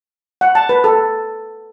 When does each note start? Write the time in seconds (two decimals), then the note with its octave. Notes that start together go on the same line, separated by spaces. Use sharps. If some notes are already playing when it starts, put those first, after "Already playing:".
0.41 F#5
0.55 A5
0.69 B4
0.84 A4